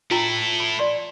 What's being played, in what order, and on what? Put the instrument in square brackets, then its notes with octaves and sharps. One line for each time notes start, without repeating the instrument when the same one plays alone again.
[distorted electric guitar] E4 A4 [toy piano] F4 G5 A#5
[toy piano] B5
D5 C6